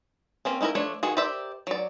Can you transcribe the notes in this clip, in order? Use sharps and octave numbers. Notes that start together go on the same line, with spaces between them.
A#3 C4 C#4
C#4 D#4 E4 G#4 A#4
F3 A3 D4 C#5
D#3 F#4 G#4
G4 A#4 C5 D5 E5
F#3 D5